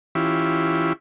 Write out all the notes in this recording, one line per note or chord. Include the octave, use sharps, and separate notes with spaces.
E3 C#4 E4 F4 G4